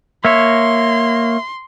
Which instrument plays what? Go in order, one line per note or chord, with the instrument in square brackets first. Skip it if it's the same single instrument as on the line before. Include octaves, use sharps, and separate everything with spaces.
[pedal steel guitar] A#3 C#5 [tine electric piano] E5 [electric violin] C6